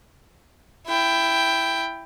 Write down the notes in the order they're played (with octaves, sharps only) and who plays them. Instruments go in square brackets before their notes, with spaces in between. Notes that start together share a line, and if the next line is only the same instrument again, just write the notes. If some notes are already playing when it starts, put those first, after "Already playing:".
[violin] E4 G5